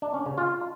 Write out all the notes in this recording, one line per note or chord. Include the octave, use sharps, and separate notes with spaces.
D4
C#4
C#3
F4